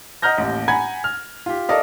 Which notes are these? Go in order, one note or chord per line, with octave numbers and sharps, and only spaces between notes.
D#5 F#5 A#5 F6 G6 A#6
A1 D#2
F#5 G#5 A#5 B5 G#6
F6
F4 G4
A4 A#4 D5 D#5 F5